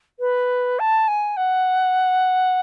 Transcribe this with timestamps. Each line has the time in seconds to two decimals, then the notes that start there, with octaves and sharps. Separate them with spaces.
0.20 B4
0.79 A5
1.08 G#5
1.37 F#5